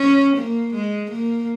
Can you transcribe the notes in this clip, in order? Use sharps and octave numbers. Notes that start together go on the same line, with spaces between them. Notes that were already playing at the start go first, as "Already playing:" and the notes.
Already playing: C#4
A#3
G#3
A#3